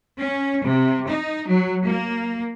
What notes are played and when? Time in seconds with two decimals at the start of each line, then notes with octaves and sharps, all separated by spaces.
0.20 C#4
0.65 C3
1.10 D#4
1.49 F#3
1.84 A#3